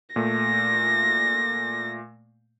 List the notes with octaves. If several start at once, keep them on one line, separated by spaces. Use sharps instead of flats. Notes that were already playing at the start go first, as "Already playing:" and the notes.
A#2 A3 A#6